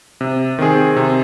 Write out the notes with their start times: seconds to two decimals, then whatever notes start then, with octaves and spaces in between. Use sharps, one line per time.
0.21 C3
0.59 D#3 C4 G#4
0.96 C3